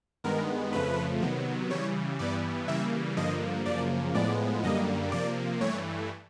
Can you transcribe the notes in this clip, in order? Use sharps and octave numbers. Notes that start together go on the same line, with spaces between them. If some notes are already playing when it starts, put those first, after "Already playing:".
G2 D#3 G#3 B3 A#4
F2 C#3 F3 A3 B4
C3 D#3 F#3 B3
C#3 E3 G3 C#5
G2 E3 G3 B3 D5
C#3 E3 G3 A#3 E5
G2 D3 F3 A#3 D#5
F#2 C#3 F3 A#3 D5
A2 F3 G#3 B3 D5
F#2 D3 G3 A#3 D#5
C3 F3 A#3 D5
G2 E3 A3 C#5